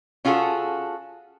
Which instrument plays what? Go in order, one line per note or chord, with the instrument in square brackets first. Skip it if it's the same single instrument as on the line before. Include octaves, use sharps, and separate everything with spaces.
[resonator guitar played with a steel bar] C#4 F4 F#4 G#4 A4